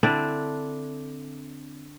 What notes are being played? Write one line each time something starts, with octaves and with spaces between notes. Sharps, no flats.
D3 C4 D4 E4